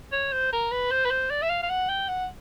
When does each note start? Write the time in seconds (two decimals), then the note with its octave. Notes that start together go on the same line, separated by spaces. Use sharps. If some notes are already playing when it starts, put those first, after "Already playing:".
0.12 C#5
0.32 C5
0.53 A#4
0.71 B4
0.91 C5
1.05 B4
1.11 C5
1.31 D5
1.42 E5
1.50 F5
1.63 F5
1.69 F#5
1.89 G5
2.08 F#5